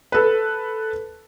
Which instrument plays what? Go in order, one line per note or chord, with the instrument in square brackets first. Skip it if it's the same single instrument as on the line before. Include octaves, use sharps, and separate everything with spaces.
[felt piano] A4 B4